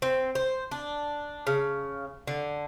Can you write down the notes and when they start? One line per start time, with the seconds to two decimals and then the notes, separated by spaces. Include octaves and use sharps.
0.02 C4
0.35 C5
0.71 D4
1.47 C#3
2.27 D3